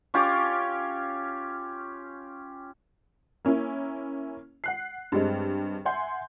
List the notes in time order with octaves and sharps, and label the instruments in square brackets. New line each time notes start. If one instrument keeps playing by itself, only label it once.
[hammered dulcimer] C#4 F4 G4 D6
[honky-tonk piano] A#3 C#4 E4
F#5 F#6 C7
G2 G3 G#3 C4
E5 F#5 G#5 C6 G6